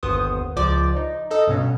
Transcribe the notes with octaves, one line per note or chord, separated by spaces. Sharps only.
G1 D#2 B3 C5 D#6
C#2 F3 D5 D6
D#4
D#4 A4 D#5
G2 B2 C#4